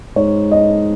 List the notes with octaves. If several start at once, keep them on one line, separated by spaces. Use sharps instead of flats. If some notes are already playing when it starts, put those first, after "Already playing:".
G#2 C#5
D#5